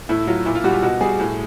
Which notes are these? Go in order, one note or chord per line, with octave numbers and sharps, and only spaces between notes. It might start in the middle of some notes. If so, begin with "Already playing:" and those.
A2 E4
F#3 F4
A#2 E4
F4
G3 F#4
F4
B2 F#4
G3 G#4
A2